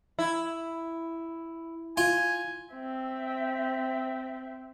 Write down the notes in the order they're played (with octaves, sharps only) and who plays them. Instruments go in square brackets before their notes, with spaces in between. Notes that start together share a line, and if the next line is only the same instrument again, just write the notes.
[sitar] E4
[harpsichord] F4 [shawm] G#5
[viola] C4 E5